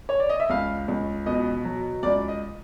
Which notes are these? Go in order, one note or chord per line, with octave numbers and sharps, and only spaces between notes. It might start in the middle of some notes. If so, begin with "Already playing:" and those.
C#5
D5
D#5
E5
C#2 F5
C#2
B2 D#5
F#3
C#2 D5
D#5